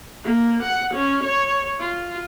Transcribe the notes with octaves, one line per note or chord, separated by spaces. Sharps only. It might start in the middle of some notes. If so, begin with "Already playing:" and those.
A#3
F#5
C#4
C#5
F4